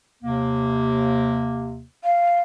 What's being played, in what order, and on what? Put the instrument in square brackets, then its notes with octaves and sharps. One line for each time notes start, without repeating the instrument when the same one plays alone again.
[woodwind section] D#2 C3 A#3
[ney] F5